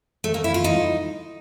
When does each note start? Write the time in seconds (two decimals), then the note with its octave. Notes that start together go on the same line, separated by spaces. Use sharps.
0.24 A3
0.34 A#3
0.44 E4
0.54 F4
0.64 D#4